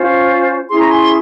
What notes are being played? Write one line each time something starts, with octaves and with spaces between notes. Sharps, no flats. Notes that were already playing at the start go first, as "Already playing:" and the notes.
Already playing: C#4 F4 C5
C#4 E4 G#4 C6
A#5
G#5 C6